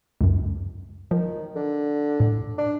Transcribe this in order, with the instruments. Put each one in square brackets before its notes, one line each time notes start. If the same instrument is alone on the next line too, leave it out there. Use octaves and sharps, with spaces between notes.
[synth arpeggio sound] C#2 F#2
[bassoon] D#3 [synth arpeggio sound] F3
[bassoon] D3
[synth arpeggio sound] A2
[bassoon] D4